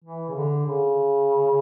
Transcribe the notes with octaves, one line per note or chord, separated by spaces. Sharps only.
E3
C#3
D3
C#3